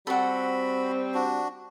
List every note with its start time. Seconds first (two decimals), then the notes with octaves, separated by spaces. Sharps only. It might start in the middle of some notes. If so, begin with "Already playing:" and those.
0.07 G3 C4 F#4 A4 F#5 B5
1.14 D4 F#4